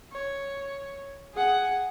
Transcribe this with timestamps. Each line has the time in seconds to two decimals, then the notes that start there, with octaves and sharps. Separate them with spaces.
0.12 C#5
1.34 G#4 F#5